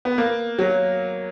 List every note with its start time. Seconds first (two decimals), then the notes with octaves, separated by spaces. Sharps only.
0.05 B3
0.18 A#3
0.59 F#3